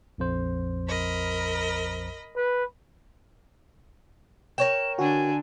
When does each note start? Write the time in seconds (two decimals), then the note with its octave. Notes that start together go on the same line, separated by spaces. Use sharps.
0.18 A#1 F2 C5
0.88 A#4 D#5 B5
2.36 B4
4.58 A#4 C#5 G5 E7
4.99 D3 D4 F#4 G#5